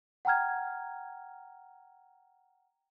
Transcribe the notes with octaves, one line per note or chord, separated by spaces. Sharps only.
F#5 G5 A#5 F6 G#6